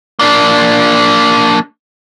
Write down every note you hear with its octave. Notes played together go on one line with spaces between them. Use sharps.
A#3 D4